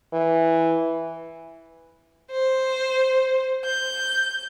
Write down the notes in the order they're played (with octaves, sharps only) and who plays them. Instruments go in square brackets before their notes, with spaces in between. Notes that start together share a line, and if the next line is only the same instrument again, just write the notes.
[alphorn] E3
[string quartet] C5
G6